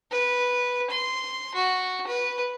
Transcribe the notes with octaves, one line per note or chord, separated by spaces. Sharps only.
B4
C6
F#4
B4